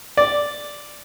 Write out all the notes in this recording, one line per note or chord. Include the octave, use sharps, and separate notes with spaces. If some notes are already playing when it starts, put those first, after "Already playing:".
D5